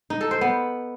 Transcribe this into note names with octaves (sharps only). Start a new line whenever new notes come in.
D#4
A4
C5
B3